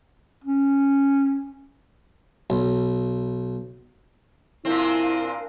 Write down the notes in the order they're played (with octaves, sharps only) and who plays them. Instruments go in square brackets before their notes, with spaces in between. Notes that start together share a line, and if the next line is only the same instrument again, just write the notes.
[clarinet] C#4
[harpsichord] B1
[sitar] A#2 C4 [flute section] D4 A#4 F5 [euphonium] E4